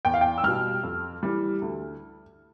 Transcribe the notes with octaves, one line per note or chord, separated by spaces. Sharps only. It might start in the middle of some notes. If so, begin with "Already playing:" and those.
E2 G5
F5
G5
E6
B2 G3 F6
F2
E3 G3
D2